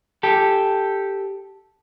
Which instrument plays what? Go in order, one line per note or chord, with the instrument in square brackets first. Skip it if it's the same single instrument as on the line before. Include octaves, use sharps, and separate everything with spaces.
[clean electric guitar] G4 A4